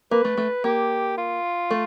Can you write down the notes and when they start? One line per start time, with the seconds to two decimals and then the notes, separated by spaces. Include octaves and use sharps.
0.11 A#3 B4
0.25 A3
0.37 A3
0.64 A#3 G4
1.18 F4
1.71 A3